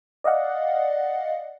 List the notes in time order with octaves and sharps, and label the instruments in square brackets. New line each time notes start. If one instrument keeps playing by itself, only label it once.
[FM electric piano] D5 D#5 F5 F#5